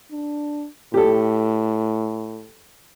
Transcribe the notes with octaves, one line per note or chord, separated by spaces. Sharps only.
D4
A2 G4 A4